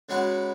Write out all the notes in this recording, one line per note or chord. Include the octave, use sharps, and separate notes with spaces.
C#3 G#3 D#4 F#4 B4